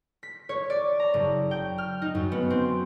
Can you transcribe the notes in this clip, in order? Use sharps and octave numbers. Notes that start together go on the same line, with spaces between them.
B6
C#5
D5
A#5
F#1
G5
F6
D#4
F#2
B3
C4